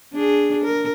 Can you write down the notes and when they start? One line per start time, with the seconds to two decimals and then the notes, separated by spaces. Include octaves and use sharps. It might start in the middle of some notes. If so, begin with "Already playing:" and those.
0.13 D4 G#4
0.64 A#4